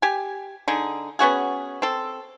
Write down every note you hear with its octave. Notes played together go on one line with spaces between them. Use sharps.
G4 G#5
D3 D#4 G#4
B3 C#4 F#4 G#4
C4 A4